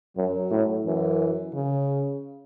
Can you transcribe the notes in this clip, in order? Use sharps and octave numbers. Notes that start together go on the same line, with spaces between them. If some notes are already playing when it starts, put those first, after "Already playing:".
F#2 F#3
A2
F#2 E3
C#3